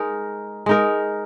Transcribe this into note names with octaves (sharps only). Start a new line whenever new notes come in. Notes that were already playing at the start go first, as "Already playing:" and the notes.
Already playing: G#3 D#4 A#4
G#3 D#4 A#4